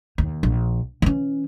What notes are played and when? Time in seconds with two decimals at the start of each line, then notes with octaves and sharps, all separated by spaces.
0.18 D#2
0.43 A#1
1.02 E3 C#4